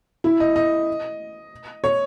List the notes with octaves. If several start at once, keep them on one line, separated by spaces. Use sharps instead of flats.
E4
D#5
D#5
C#5